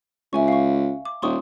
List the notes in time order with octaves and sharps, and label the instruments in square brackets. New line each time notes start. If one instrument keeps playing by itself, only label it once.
[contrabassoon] C#2 [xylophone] E5 G#5 C#6
[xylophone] F5 C#6
D6
[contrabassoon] D#1 [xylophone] C6 C#6 D#6